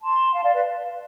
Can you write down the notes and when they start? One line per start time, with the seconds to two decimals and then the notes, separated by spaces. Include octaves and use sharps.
0.02 A5 C6
0.33 F5 A5
0.43 D5 F5
0.54 B4 D5